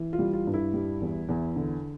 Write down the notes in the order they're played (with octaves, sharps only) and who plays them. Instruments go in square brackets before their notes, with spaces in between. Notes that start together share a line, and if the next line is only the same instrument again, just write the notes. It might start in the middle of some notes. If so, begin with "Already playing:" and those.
Already playing: [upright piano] E3
F4
G3
F4
G2
E4
G3
E2
E2
D3